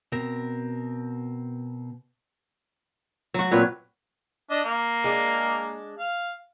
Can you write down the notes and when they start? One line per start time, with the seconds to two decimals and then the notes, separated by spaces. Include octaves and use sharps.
0.12 B2 C4 A#4
3.34 F#3 F#4
3.51 A#2 C4 B4 C#5
4.50 D4 D#5
4.64 A#3
5.04 G#3 D4
5.99 F5